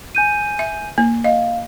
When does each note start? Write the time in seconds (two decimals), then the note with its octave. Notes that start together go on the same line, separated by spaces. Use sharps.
0.15 G#5 G6 D#7
0.59 E5
0.98 A#3
1.24 D#5 F5